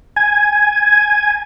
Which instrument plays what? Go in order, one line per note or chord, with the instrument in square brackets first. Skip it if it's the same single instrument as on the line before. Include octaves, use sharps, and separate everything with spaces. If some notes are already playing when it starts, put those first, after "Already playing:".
[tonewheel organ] G#5